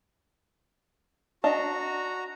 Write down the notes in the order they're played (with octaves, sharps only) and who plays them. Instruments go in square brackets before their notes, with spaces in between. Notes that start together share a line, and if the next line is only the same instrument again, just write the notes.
[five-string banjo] D4 D#5 A5 [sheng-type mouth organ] F#4 A#5